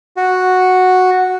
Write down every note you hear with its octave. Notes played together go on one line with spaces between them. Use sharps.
F#4